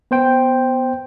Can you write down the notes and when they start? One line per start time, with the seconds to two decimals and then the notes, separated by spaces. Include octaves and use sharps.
0.11 B3 C5 G5